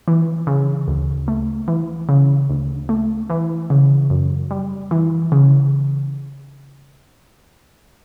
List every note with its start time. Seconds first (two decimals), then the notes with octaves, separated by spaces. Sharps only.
0.08 E3
0.47 C#3
0.88 D2
1.28 A3
1.68 E3
2.09 C#3
2.50 D2
2.89 A3
3.30 E3
3.70 C#3
4.10 F#2
4.51 G3
4.91 E3
5.32 C#3